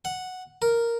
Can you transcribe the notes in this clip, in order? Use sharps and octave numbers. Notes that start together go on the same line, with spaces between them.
F#5
A#4